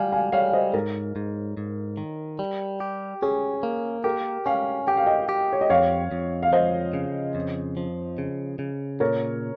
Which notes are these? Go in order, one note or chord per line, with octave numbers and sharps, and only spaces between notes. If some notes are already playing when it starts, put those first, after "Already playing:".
Already playing: G3 F5 G#5
F5 G#5
G3 C#5 F5
F5
C5 D#5
G#2 A#4
G#2
G#2
D#3
G3
G4
C#4 G#4
A#3
G4 A#4
C#4 F5 G#5
G4 G5
F5
D#5 G5
G4
C#5
D#5
F2 C#5 F5
F2
F5
F3 C5 D#5
C#3
F2
F3
C#3
C#3
A#2 A#4 C#5